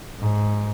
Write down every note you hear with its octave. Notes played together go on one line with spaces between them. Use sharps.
G#2